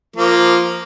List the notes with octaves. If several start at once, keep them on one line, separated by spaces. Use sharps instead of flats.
F3 A#3